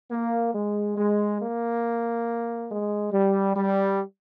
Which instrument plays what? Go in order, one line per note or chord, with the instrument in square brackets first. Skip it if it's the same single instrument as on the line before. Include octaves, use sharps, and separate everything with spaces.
[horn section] A#3
G#3
G#3
A#3
G#3
G3
G3